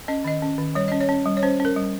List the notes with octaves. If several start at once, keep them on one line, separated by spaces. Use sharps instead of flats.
C#4 D#5
D#3 D#5
C#4
D#3
G3 C#5
C#4 D#5
C#5
C#4
G3
C#5
C#4 C5
C#4
A#4
G3